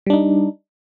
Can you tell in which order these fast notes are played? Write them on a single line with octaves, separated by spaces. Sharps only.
G3 D4 D#4